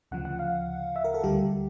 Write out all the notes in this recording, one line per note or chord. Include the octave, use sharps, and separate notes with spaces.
D2 C#3 F3 F#5
F#5
F5
E5
A#4
A4
D2 D3 G3 G4